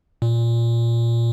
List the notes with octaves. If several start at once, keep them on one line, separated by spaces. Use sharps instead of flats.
A#2